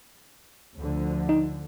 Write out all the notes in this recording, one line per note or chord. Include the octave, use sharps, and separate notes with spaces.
D2 D3 F3
D#4